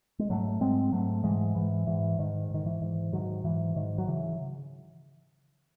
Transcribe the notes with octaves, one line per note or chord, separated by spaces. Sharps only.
G#3
G#2 F#3 A3
G#2 G#3 C4
G#2 F#3 A3
G#2 E3 G#3
G#2 E3
G#2 E3
G#2 D#3
G#2 D#3
E3
G#2
G#2 D#3 F#3
G#2 E3
G#2 D#3
F#3
C#3 E3